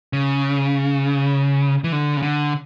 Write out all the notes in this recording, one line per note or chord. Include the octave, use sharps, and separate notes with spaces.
C#3
E3
D3
C#3
D3